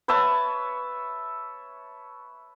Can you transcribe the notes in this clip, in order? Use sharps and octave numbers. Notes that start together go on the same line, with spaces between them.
B4 C#5 E5 A5